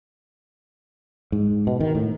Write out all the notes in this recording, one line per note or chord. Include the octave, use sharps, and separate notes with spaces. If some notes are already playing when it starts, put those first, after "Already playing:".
G#2
B2
D#3
A2